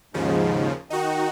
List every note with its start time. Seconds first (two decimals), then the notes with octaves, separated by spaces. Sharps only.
0.14 D#2 G#2 C#3 F3
0.90 D#3 D#4 F#4